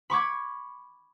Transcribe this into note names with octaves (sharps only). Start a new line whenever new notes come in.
B5 C#6 D6 G#6